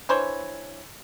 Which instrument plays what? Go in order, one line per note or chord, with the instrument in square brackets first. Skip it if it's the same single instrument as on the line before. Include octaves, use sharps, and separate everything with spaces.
[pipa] E3 D4 C5 C#5